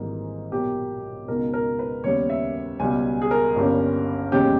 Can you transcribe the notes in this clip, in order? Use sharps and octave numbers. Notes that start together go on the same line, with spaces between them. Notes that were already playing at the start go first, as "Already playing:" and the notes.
Already playing: G#1 G#2 E3 G3 A#3 G#4
B1 A#2 A#3 G4
C#2 B2 G#3 D#4 A#4
A#4
B4
D#2 C#3 G3 B3 C#5
E5
C#2 B2 G3 G#5
G#4
A#4
G1 G2 G3 A#3 C#4
E1 D#2 C#3 G#3 C#4 G4